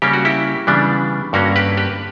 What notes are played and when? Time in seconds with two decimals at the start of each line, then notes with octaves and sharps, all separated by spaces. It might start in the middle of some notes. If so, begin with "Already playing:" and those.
0.02 C#3 G3 A#3 C#4 G4
0.13 F#4
0.25 E4 G4
0.67 C#3 E3 G3 B3 D4
1.33 G2 D3 A#3 C#4 F#4 A#4
1.56 G4 B4
1.77 G4 B4